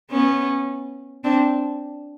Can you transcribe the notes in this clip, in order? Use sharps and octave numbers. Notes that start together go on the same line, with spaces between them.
B3 C#4
C4 D4